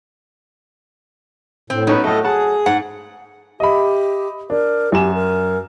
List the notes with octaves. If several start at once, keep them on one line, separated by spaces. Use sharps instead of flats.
A2 C4
F#3 B3 C#4 D#4
A2 A3 A4 D#5
G#4 F#5 A5
G#2 F#5
G4 D#5 E5 B5
D4 A#4
F#2 G4 G#5 E7
A#4